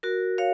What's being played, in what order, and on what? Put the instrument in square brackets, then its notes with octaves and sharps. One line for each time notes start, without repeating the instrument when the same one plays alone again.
[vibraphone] F#4 A#4
C#5 F5